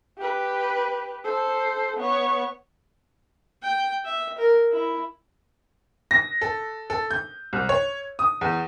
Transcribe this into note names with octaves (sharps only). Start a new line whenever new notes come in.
G4 B4
A4 C5
B3 C#5
G5
E5
A#4
E4
A#6
A4
A4
G6
C2
C#5
D#6
E2